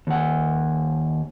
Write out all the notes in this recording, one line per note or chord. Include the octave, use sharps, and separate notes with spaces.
D#2 F#5